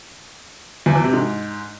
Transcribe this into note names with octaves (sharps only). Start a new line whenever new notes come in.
E2
E3
C3
G#2